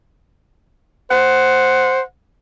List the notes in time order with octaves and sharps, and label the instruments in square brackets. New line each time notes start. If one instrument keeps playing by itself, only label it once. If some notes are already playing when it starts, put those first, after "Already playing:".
[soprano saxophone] C5 [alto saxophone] F#5